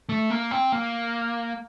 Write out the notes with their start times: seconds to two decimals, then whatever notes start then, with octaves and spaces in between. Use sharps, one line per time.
0.09 A3
0.30 A#3
0.51 C4
0.72 A#3